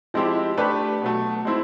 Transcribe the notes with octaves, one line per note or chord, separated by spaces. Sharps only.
F3 G#3 C4 E4 G4
A3 D4 G4 B4
B2 F#3 A3
G#3 C4 E4